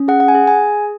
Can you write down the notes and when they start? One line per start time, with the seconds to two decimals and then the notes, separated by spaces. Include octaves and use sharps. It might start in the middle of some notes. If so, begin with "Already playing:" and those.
Already playing: C#4
0.08 G#4 F#5
0.20 F#5
0.28 G#5
0.35 G#4
0.47 G#5